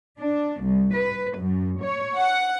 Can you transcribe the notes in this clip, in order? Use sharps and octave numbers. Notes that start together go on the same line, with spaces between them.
D4
C2
B4
F#2
C#5
F#5